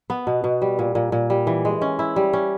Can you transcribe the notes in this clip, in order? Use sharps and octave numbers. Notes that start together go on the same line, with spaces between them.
B3
B2
B2
G3
A#2
A#2
A#2
G3
E3
G#3
C#4
E4
G3
C#4